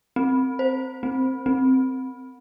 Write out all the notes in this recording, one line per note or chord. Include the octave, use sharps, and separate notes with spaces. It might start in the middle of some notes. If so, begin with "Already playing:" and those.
C4
C5
C4
C4